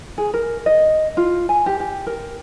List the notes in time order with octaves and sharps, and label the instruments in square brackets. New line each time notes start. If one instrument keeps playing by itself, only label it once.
[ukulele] G#4
A#4
D#5
F4
G#5
G4
G4
A#4